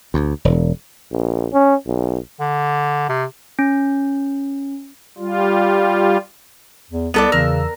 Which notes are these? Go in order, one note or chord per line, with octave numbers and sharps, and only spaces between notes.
D2
E1
A#1
C#4
B1
D3
C3
C#4
G3 F4
E2
C2 B3 A4 D5
E2 C#3 A#4 E6